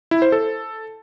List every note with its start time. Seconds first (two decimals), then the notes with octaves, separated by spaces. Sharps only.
0.11 E4
0.22 C5
0.32 A4